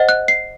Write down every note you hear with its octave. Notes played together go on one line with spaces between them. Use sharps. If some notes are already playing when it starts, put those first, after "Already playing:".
Already playing: C5 D#5 F#5
F#6
C7